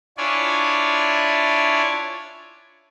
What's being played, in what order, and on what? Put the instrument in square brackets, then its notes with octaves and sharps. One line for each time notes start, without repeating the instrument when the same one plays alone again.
[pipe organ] D4 E4 F4 C#5 D5 G#5